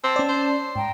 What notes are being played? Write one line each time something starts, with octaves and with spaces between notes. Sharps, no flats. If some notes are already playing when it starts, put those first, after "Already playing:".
C4 A5
C#4 D5
C5
G#2 G5 A#5